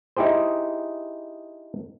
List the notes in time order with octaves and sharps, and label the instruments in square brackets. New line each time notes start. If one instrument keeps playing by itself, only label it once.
[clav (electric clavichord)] D#4 E4 G4 G#4 C5